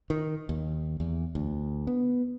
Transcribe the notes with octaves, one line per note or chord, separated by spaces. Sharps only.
D#3
D#2
E2
D2
B3